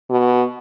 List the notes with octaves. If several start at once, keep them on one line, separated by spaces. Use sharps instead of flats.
B2